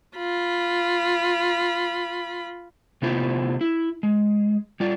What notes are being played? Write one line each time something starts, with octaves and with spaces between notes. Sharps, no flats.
F4 B5
C3 A3 B3 E4 F4 C5
E4
G#3
G3 F4 D5